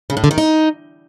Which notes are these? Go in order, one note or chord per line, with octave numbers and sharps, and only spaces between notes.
C#3
A2
D3
D#3
D#4